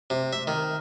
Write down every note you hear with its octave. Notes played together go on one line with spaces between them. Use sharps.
C3
E5
D#3